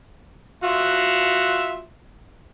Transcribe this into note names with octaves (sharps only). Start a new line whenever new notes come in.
F4 F#4 E5